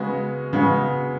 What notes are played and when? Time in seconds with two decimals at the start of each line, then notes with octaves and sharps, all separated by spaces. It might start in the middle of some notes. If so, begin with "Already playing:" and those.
Already playing: C#3 G#3 B3 F#4
0.53 C#3 G#3 B3 F#4